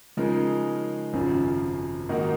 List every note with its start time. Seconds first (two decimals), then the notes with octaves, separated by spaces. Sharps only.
0.17 C#3 F3 G#3 D#4 A#4
1.13 G#1 F#2 C#3 F3
2.09 G#2 D#3 A#3 D#4 F#4